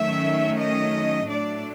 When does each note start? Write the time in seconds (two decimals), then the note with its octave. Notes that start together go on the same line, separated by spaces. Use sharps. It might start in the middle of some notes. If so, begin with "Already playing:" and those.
Already playing: D#3 F#3 A3 C#4 E5
0.58 D#5
1.29 A2 F#3 A3 D4 D5